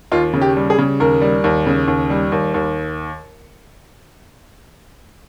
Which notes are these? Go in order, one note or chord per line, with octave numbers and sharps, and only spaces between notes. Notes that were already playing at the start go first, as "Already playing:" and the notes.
D#2 F4
C#3
G4
G3
G#4
C#3
D#2 A#4
G3
D#2
C#3
D#2
G3
D#2
D#2